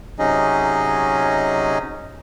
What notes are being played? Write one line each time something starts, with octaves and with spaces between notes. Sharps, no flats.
C3 F#3 C#4 D#4 G#4 D#5